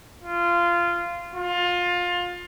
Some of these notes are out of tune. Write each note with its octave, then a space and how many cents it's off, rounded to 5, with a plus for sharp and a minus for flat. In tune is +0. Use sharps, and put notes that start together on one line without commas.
F4 -15
F4 +20